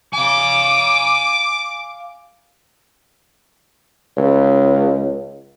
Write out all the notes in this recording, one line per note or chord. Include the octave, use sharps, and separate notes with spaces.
F5 G#5 D6
C#2